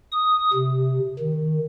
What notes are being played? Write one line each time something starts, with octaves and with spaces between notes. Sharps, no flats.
D#6
C3
D#3